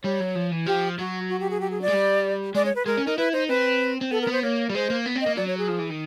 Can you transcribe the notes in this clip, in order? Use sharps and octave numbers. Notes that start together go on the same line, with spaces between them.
G3 C#5
F#3
F3
E3
F3 G4
F#3 F#4
F#4
G4
G#4
G4
G#4
D5
G#3
G3
G#3 D5
C#5
B4
G#3 A#4
C#4
D#4 A#4
E4 B4
D#4 C5
C4 B4
C4
B3 A4
A#4
B3
C5
A#3 C#5
G3
G#3 C5
A#3
B3
C4
A#3 D#5
F#3 D5
C#5
G#4
F3
E3
D#3